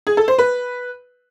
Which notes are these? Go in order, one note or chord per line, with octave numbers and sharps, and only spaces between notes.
G#4
A4
C5
B4